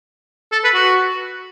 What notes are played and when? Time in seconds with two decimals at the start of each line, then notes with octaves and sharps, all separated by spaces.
0.52 A4
0.64 B4
0.75 F#4